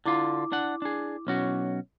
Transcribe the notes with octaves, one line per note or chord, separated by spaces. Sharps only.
D3 E4 F4 D6
D4 F#5
D4 G#4
B1 C#4 F#4